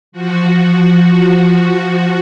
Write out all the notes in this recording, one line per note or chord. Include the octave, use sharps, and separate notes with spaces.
F3 F#4